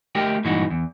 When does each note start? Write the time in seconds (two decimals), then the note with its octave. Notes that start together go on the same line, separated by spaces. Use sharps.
0.15 A3 G4 A#4 D#5 G5
0.44 G2 A#2 E3 G#3 D#4 F#4
0.70 E2